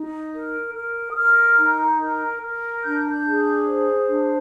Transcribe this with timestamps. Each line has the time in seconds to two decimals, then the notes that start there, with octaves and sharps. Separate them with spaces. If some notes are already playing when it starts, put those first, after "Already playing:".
Already playing: D#4
0.34 A#4
0.75 A#4
1.11 D#6
1.17 A#4 F6
1.58 D#4
2.00 A#4
2.42 A#4
2.83 D4 G6
3.08 G6
3.25 G#4
3.67 C5
4.09 D4